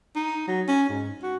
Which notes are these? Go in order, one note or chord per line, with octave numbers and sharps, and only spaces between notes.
D#4
F#3
C#4
G#2
F#4